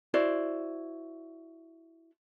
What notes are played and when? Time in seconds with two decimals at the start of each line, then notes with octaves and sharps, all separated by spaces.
0.14 E4 F#4 C5 D5